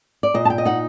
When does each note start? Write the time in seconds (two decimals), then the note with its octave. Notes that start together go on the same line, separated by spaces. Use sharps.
0.23 D5
0.34 A#2 D#5
0.45 A5
0.50 G5
0.58 D#5
0.65 D#4 F#5